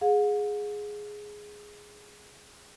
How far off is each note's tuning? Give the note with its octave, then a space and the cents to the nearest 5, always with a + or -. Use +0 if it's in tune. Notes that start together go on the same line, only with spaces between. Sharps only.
G#4 +0 F#5 -45